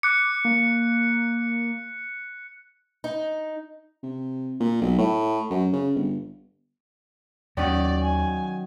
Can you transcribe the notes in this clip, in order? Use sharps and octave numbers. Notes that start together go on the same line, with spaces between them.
D6 F#6 C#7
A#3
D#4
C3
A#2
B1
A2
F#2
C#3
G1
D#2 D#3 F#3 C#4 D5
G#5